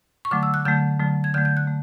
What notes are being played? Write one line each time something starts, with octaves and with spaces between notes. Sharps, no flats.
C#6
D3 F#3 A3 D6
E6
F#6
D3 F#3 A3 G6
D3 F#3 A3
G#6
D3 F#3 A3 G6
G6
F#6
A3